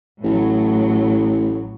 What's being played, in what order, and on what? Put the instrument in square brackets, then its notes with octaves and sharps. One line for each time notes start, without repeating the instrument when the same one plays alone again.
[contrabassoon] A1 [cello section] A2 F#3